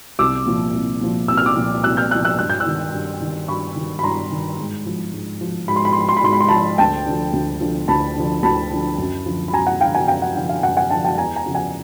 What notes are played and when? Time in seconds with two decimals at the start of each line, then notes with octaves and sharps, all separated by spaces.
0.19 C2 D6 E6
0.46 A#2 F3
0.74 C2
1.01 A#2 F3
1.28 C2 E6
1.37 F6
1.46 D6 E6
1.56 A#2 F3
1.84 C2 E6 F#6
1.97 F6 G6
2.11 A#2 F3 E6 F#6
2.25 E6 F#6
2.39 G2 F#6
2.50 G6
2.60 E6 F#6
2.66 D#3
2.94 G2
3.21 D#3
3.48 G2 B5 C#6
3.76 D#3
3.99 B5
4.04 G2 A#5 C6
4.31 D#3
4.59 G#2
4.86 F3
5.13 G#2
5.41 F3
5.68 G#2 B5
5.76 C6
5.85 B5
5.93 C6
5.96 F3 B5
6.09 C6
6.17 B5
6.24 G#2 C6
6.33 B5
6.41 C6
6.48 F3 A5 B5
6.78 D2 G5 A5
7.06 D3 F3
7.33 D2
7.60 D3 F3
7.88 D2 A5 B5
8.16 D3 F3
8.43 D2 A5 B5
8.71 D3 F3
8.98 F#2
9.26 D3 F3
9.48 B5
9.53 F#2 G#5 A#5
9.67 F#5
9.80 D3 F3 F5 G5
9.95 F#5 G#5
10.08 F#2 F5 G5
10.22 F#5
10.35 D3 F3 F#5
10.49 F5
10.63 F#2 F#5
10.77 F#5 G#5
10.90 D3 F3 G5 A5
11.04 G5 A5
11.18 E2 G#5 A#5
11.36 G#5 A#5
11.46 C#3 F3
11.55 F#5 G#5